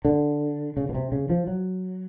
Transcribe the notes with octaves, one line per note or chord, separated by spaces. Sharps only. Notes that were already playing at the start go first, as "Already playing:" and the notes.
D3
C#3
B2
C3
C#3
F3
F#3